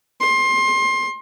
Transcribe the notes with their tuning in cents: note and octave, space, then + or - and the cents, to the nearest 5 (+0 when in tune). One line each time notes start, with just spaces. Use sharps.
C6 +25